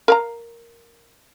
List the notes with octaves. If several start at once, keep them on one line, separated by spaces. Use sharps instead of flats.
A#4 F5 A#5